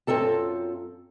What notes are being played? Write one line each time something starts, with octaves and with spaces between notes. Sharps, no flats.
F#2 C4 F4 A4 A5